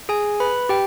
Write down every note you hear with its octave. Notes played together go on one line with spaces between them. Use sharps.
G#4 G#5
B4 B5
G4 G5